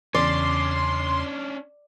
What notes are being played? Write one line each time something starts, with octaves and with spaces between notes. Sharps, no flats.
E2 C#3 C#4 D4 D5 C6